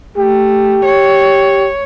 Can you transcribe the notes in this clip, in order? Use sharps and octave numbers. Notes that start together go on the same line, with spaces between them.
A3 G4
C#5